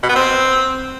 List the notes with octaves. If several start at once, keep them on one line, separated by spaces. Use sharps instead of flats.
B2
B3
C4